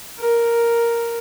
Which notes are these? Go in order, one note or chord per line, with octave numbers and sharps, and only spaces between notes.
A#4